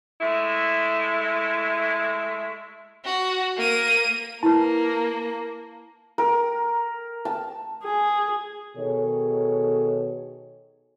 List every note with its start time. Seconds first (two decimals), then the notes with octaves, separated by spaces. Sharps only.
0.21 G#3 A3 E4
3.05 F#4
3.58 A#3 D#7
4.43 A#3 E4 B4 A5
6.18 A#4
7.25 A5
7.84 G#4
8.76 B2 D#3 G#4 A4 C#5